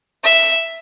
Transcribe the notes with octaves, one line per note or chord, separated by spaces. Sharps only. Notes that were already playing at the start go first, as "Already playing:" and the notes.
E5